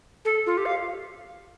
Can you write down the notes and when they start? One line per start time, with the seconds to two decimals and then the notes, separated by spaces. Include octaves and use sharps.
0.25 A4
0.46 F4
0.57 G4
0.65 F5